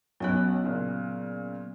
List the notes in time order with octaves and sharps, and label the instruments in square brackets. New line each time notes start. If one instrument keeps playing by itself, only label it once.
[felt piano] B1 C#4 F#6 [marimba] F#3 B3
[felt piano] A#2 C#3